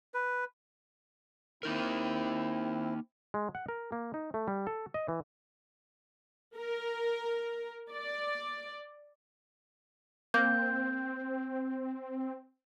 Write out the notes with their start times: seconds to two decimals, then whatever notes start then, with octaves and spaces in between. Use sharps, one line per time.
0.14 B4
1.63 A#3 C4 D#4 E4 A#4
3.34 G#3
3.55 F#5
3.68 A#4
3.92 A#3
4.14 D#4
4.34 A3
4.48 G3
4.67 A4
4.94 D#5
5.08 E3
6.56 A#4
7.91 D5
10.34 A#3 C4 G6